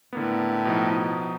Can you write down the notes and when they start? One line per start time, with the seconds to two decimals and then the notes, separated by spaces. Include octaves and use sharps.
0.13 A2 D3 A#3 B3
0.65 B2 F3 D#4